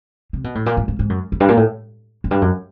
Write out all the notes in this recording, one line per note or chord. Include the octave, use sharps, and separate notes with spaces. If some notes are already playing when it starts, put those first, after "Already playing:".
C3
B2
A2
A#2
G#2
G#2
G#2
F#2
F2
G2
A#2
A2
F#2
G2
F#2